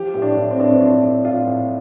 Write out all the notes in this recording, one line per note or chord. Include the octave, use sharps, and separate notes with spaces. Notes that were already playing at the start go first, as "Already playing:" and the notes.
Already playing: F3 G4
A2
D4
A2
C4
A2 D4
C4
F3 D4
A2
A2 F4
A2